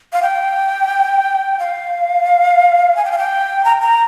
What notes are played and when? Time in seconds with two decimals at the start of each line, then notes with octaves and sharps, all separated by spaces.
0.13 F5
0.23 G5
1.59 F5
2.96 G#5
3.05 G5
3.12 F5
3.18 G5
3.64 A#5
3.81 A#5